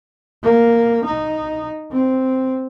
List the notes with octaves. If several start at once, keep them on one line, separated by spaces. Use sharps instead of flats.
A#3
D#4
C4